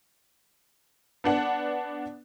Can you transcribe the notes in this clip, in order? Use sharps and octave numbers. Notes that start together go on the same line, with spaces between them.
B3 D4 F#5